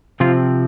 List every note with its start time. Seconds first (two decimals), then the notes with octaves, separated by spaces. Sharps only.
0.20 C3 F3 C4 F4